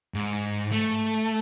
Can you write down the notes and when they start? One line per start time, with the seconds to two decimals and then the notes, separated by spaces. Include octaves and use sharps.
0.14 G#2
0.71 A3